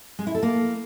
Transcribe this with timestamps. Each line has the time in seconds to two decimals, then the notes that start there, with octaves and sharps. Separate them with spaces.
0.19 G#3
0.27 E4
0.35 A4
0.43 A#3